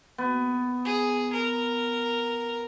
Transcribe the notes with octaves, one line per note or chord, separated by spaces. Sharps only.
B3
G#4
A#4